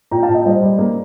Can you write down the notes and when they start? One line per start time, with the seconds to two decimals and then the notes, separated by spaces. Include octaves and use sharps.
0.11 A#2 G5 A#5
0.23 F5 A5
0.28 A#2
0.34 D#5 G5
0.45 G3 C5 D#5
0.62 G3
0.79 A#3